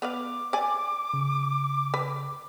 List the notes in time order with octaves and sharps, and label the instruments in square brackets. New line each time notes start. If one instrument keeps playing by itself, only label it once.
[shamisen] B3 B4 F5 [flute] D6
[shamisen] D5 G#5
[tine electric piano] C#3
[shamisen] B4